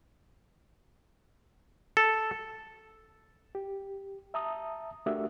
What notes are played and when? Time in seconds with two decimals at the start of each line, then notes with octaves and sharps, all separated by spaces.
1.97 A4
3.55 G4
4.34 E5 A5 A#5 D#6
5.06 A3 D4 F#4 G4 A#4 E5